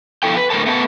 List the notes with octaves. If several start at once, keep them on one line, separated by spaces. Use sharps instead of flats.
F2 B2 E4 A4 G5
B4
A2 D3 A#4 C5 A5
A3 B3 D4 B4 A5